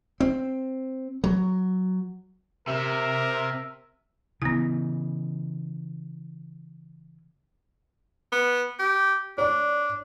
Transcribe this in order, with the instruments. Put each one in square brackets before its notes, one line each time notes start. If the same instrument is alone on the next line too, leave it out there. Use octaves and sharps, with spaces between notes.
[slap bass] C4
F#3
[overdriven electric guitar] C3 [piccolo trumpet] A#4 [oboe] E5
[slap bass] C#3 E3 [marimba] B3 E4
[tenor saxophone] B3
G4
[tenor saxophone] D4 [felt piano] C#5 D5